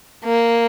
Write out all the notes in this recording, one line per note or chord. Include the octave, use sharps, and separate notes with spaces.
A#3